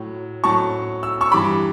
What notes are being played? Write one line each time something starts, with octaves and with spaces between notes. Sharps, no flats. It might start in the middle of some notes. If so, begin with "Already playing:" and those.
Already playing: A2 F#3
A2 F#3 A5 C#6
E6
C#6 E6
G2 E3 G3 B5 D6